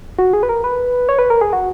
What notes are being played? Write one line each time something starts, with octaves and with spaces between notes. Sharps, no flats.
F#4
G#4
B4
A#4
B4
C#5
B4
A#4
G#4
F#4